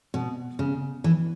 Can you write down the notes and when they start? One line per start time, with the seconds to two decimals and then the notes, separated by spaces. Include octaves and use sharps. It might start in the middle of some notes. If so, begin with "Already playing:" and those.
0.14 B2
0.59 C#3
1.04 E3